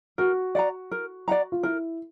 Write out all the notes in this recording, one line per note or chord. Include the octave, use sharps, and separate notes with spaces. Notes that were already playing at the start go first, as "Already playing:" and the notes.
F#4 A#4
D5 F#5 A#5
A#4
D5 F#5 A#5
F4
E4 A#4